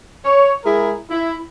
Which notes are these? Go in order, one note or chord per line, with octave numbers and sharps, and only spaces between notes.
C#5
G#3 E4 G#4 A#4
E4